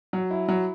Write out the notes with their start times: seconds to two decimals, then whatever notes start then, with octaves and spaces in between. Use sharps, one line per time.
0.13 F#3
0.31 E4
0.48 F#3